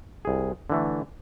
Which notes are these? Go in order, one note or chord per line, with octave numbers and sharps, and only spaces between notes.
C2 G#4
D3 E3 A3